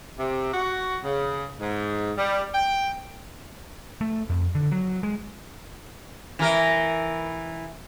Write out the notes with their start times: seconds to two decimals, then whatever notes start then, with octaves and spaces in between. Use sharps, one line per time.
0.18 C3
0.53 F#4
1.04 C#3
1.60 G#2
2.17 G3
2.54 G5
4.01 A3
4.30 F2
4.55 D3
4.71 F#3
5.03 G#3
6.39 E3 A#4